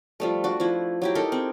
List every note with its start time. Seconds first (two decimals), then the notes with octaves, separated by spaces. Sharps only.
0.20 F3 G3 A3
0.44 D4 F#4
0.60 F3 E4
1.02 F#3 E4 G4
1.15 D#4 E4 A4 A#4
1.32 C4